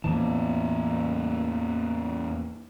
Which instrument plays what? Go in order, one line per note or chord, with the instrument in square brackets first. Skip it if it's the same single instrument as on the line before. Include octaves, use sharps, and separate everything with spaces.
[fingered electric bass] E2 A2 E3 [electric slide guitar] A#3 A5